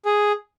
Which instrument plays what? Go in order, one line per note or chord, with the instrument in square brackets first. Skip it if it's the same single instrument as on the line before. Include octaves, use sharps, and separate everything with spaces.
[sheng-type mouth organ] G#4